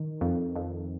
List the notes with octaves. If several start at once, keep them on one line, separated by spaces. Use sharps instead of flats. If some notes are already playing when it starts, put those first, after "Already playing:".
Already playing: D#3
F2
F2